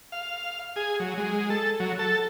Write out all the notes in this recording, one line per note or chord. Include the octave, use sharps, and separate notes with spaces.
F5
G#4
F#3
G#3
A4
F#3
A4